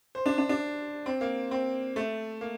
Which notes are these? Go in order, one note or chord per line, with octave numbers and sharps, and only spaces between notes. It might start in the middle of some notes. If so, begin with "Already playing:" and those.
C5
D4
D4
D4
C4
A#3
C4
A3
A#3